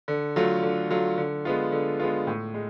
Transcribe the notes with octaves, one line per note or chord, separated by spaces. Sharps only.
D3
F#3 A3 F4
D3
F#3 A3 F4
D3
G#3 B3 F4
D3
G#3 B3 F4
A2
G#3